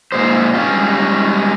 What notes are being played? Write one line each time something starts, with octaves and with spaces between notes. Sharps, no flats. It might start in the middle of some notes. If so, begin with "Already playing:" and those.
A#2 G#3 C5
G3 G#3 C#4 F4 G4